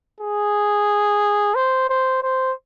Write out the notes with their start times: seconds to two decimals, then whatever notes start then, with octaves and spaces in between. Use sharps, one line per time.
0.20 G#4
1.55 C5
1.90 C5
2.23 C5